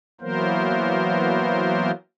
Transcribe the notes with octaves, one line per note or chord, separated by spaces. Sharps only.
E3 F#3 A#3 B3 A#4 C5